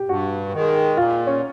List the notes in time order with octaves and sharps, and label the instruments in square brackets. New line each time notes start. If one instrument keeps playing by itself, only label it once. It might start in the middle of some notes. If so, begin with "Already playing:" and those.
Already playing: [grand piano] G4
[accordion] G2 [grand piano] F#4
[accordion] D#3 G#3
[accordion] A#2 [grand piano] F4
[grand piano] C#4